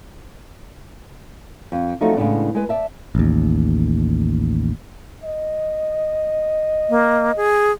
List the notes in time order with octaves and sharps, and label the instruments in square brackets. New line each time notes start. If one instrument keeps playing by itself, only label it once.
[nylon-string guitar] F2
F3 F#3 A3 C4 D#4 F#4
A2 C#3 E3 G#3 B3 D4
G#3 B4
D5 E5 A5
[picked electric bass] A1 D#2
[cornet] D#5
[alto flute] A#3
G#4